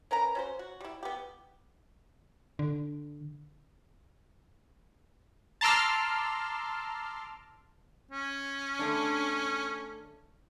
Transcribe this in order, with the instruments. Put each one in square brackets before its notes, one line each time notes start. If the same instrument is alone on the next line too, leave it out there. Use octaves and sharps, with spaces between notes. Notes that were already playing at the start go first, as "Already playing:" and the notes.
[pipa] C#4 A#4 B4 A#5
C#4 F#4 C5
F#4
G3 E4
B3 G4
[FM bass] D3
[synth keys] A5 A#5 C6 D6 E6 F6
[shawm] C#4
[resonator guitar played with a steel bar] D3 A3 D4